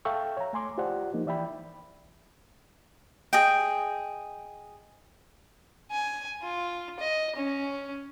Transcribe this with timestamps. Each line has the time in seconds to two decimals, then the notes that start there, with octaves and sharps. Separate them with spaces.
0.05 A4 E5 F5 G5 C#6 E6
0.37 C#5 A#5
0.53 A3 G#5 C6 D6
0.78 F4 G4 C5 D5 F#5
1.14 F3 A#3 D#4
1.26 E3 D5 E5 G5 B5
3.33 G#4 D#5 G5
5.91 G#5
6.42 F4
7.00 D#5
7.35 C#4